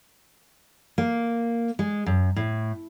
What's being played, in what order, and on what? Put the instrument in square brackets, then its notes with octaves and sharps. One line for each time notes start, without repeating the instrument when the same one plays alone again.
[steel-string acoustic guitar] A#3
G#3
F#2
A2